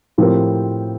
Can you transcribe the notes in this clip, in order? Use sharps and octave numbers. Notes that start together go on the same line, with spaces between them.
A2 F3 C4 G4 A#4